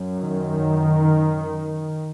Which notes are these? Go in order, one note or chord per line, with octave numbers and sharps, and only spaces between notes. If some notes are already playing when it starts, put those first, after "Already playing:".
Already playing: F#2
D#3